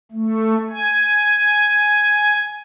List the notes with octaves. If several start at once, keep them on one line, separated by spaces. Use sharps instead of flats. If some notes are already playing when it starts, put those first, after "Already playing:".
A3
G#5